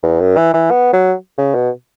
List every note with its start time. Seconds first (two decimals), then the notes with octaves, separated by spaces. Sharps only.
0.03 E2
0.20 F#2
0.37 E3
0.54 E3
0.71 B3
0.93 F#3
1.38 C#3
1.55 B2